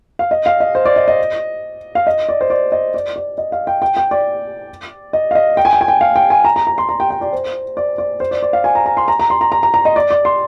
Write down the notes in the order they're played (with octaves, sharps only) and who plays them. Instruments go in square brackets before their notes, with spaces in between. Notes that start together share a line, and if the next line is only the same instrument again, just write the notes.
[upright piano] F5
D#5
F5
D#5
C5
D5
D#5
D#5
F5
D#5
D5
C5
D5
D#5
D5
D5
D#5
F5
G5
G5
G5
D5
D#5
F5
D#5
G5
G#5
G5
G#5
G5
F5
G5
G#5
A#5
A#5
A#5
C6
A#5
G5
G5
D5
C5
D5
D5
C5
D5
D5
F5
G#5
A#5
A#5
C6
A#5
A#5
C6
A#5
A#5
A#5
A#5
D#5
D5
D5
C6